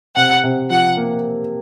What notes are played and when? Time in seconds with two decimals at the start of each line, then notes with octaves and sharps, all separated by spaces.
0.16 C3 F#5
0.44 C3
0.70 F3 F#5
0.97 A#3